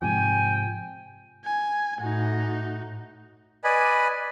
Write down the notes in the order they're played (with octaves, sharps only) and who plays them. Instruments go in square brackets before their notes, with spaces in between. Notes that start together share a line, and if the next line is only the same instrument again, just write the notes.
[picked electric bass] G#2 C3 F3 [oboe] G5 [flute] G#5
[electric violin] G#5
[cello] A2 [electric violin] D#4 F#4
[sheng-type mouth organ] B4 D5 D#5 G#5 B5